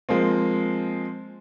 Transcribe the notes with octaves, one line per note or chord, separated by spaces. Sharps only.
F3 G#3 A#3 C4